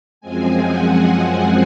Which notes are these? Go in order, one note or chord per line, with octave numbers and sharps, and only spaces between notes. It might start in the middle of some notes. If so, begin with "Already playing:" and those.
F#2 F3 G#3 C4 G#5
F#5